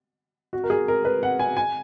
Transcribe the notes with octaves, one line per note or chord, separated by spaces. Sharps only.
F#4
A#4
G#4
A#4
B4
F#5
G#5
G#5